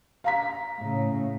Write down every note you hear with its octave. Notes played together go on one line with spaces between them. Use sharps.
F5 A#5 B6
A2 C#3